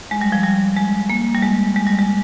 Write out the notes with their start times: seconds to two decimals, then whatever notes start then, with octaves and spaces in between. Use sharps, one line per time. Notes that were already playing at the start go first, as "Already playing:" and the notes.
0.11 G#3
0.21 G3
0.32 F3
0.43 G3
0.77 G#3
1.10 A#3
1.34 G3
1.42 G#3
1.76 G#3
1.87 G3
1.98 G#3